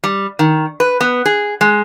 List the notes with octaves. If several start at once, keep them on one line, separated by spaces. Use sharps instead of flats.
G3
D#3
B4
B3
G#4
G#3